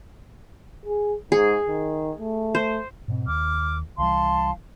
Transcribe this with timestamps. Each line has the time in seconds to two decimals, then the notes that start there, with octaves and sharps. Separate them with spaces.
0.85 G#4
1.32 G#2 G#4
1.67 D#3
2.19 A3
2.55 C5
3.08 G#2 B2 C4
3.28 D#2 D6 F6
3.98 C2 E3 G3 F5 A5 C6